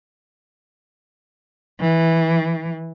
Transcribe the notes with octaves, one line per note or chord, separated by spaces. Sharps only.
E3